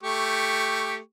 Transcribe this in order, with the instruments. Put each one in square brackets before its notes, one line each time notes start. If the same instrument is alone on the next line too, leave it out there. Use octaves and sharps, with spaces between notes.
[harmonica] A3 G4 C#6